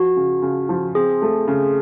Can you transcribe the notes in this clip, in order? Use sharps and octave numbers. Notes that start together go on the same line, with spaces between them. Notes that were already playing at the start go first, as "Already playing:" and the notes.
Already playing: F3 F#4
C#3
C#3
F3
C4 G#4
A3
C#3